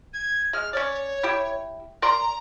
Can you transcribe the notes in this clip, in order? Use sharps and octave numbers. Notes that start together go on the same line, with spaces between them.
G#6
G#3 F6
C#4 C#5 D5
E4 G4
A#4 D5 A#5 C6